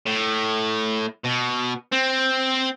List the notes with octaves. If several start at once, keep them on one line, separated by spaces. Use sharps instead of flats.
A2
B2
C4